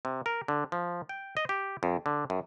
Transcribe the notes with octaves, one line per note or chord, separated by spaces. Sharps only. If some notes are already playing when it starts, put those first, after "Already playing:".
C3
A#4
D3
F3
G5
D#5
G4
F2
D3
F#2